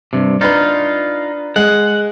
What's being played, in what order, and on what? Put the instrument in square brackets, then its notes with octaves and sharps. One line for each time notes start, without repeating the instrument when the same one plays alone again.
[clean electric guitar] G2 C3
[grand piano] D4 B4 [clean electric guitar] D#4 F4
[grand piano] G#3 [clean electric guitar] F#5